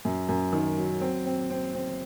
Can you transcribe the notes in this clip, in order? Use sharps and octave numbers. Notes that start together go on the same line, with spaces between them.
F#2
F#2
D#3
F#3
C4
C4
C4
C4